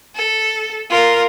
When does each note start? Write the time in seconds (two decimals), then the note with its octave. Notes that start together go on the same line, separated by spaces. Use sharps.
0.15 A4
0.90 F4 A#4